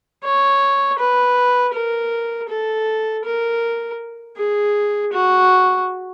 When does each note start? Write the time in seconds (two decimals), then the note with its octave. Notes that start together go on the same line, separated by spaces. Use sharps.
0.24 C#5
0.99 B4
1.73 A#4
2.49 A4
3.25 A#4
4.37 G#4
5.12 F#4